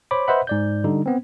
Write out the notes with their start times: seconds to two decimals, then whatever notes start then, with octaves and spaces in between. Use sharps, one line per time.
0.11 C5 C#5 B5 D6
0.28 B4 C5 D#5 E5 F#5 B5
0.47 G#2 D5 G6
0.84 D3 G3 D#4
1.06 B3 C4